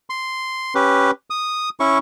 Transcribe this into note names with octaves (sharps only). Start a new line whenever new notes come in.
C6
C#4 G4 B4
D#6
C#4 E4 C#6